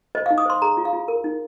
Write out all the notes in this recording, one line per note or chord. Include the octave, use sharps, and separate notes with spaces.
C5 D#5
F5
D#4
D#6
C5 C6
G#4 A#5
F4
F5
F4
A#4
D#4